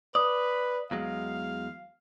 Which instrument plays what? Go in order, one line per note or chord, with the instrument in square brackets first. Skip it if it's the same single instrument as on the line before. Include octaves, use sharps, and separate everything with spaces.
[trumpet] B4 [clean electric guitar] D5 [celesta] D#6
[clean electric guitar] E2 F#3 G#3 [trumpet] F5